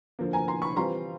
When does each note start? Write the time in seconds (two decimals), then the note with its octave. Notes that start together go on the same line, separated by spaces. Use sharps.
0.19 D3 F3 A#3
0.33 G#5 A#5
0.48 A#5 C6
0.62 B5 C#6
0.76 E3 G3 C4 F4 A#5 C6